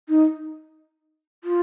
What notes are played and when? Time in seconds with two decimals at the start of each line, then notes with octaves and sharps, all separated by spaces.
0.09 D#4
1.44 F4